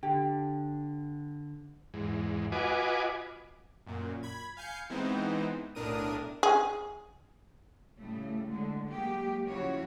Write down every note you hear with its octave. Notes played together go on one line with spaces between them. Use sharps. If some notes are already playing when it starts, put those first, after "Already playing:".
D3 G4
E2 G#2
F4 F#4 B4 D#5 G#5 D6
F#2 A#2
B5 G#6
F5 G#5 G6 C7 C#7
E3 G#3 B3 C4 D#4 C5
B1 A2 D4 A#4 D#6 D#7
G#4
A2 C#3 G3 A3
D3 F#3 G#3
F#3 G#3 A#3 G4
C#3 F3 E4 F#4 C#5